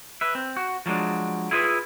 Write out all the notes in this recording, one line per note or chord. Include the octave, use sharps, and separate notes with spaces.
B4 E5
C4
F#4
F3 F#3 G#3 D4
E4 F4 G#4 B4 D#5 E5